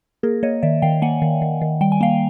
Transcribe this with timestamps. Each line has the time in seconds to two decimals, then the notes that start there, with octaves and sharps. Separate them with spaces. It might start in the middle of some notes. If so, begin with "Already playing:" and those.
0.23 A#3 G#4 A#4
0.43 A#3 C#5 D#5
0.62 D#3 D5 E5
0.82 D#3 F5 G5
1.02 A#3 F#5 G#5
1.22 D#3
1.42 D#3
1.61 D#3
1.81 G3 G5
1.92 G#5
2.01 A#3 F5 G5